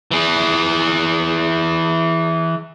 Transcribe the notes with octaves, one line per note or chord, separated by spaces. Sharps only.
E3 G#4